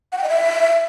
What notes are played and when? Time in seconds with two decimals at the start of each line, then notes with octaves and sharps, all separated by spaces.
0.12 F#5
0.18 G5
0.24 D#5
0.29 E5